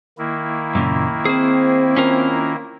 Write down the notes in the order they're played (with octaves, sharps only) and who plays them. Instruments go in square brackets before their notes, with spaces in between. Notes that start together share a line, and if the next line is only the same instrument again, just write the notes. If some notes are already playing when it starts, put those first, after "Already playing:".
[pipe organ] D#3 A#3 E4
[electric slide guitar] F#2 A#2 C#3
[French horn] C4 [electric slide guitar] G#4 C5
[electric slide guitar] C#4 F4 A#4